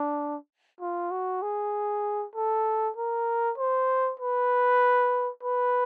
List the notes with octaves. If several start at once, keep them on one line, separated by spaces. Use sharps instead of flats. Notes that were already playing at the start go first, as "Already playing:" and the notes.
Already playing: D4
F4
F#4
G#4
A4
A#4
C5
B4
B4